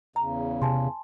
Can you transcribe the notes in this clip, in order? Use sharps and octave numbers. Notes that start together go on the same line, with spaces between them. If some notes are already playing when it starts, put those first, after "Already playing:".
E2 C#3 A#5
C3 G#5 A5 C6